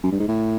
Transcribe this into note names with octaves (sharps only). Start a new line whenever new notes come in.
F#2
G2
G#2
A2